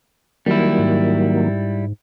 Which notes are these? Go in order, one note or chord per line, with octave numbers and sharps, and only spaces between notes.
D#3 F#3 G3 A#3 E4
G#2